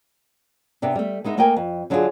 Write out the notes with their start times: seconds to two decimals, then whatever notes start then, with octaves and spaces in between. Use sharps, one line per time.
0.82 C3 B3 D4
0.96 G3 A3
1.24 G#3 B3 D#4 E5
1.37 A3 A#3 A#4 D#5 G5 G#5
1.56 F2
1.90 D3 F#3 D4 E4 F4 G#4